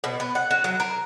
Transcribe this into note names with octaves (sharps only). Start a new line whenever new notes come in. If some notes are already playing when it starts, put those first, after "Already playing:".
B2
B3
F#5
F#4
F#3
A#4